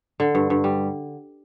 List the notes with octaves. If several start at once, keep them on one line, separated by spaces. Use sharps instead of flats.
D3
G2
G2
G3